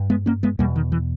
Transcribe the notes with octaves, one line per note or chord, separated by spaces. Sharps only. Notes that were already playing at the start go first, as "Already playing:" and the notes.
Already playing: G2
G#3 B3
A#3 C#4
G#3 B3
E2 B2 G3 A#3
D#3
E3